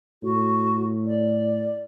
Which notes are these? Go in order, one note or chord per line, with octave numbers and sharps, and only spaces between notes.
A2 F#4
D5